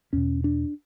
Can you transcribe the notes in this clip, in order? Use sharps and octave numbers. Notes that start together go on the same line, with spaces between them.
E2 B2 C#4
D4